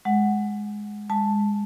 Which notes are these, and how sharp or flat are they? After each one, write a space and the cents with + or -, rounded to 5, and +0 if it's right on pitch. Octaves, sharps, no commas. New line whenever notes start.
G#3 +5 F#5 +0
G#3 -15 A5 +0